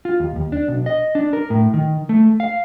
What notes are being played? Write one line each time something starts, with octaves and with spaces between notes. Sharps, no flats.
F4
D#2
D#2
D4
B1
D#5
D4
A#4
A2
D#3
A3
F5